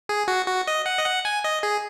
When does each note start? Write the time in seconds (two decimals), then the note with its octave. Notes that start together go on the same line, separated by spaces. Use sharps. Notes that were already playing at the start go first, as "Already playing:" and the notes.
0.09 G#4
0.28 F#4
0.47 F#4
0.68 D#5
0.86 F#5
0.98 D#5
1.05 F#5
1.25 G#5
1.44 D#5
1.63 G#4